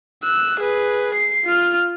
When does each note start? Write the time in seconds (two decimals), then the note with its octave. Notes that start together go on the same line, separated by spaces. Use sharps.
0.23 E6 F#6
0.60 G#4 B4
1.15 C7
1.45 F4 F6